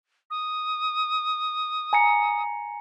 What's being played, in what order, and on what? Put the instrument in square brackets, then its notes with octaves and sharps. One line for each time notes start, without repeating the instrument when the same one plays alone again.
[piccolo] D#6
[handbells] G#5 A#5 C#7